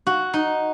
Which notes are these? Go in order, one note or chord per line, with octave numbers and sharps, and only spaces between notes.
F#4
D#4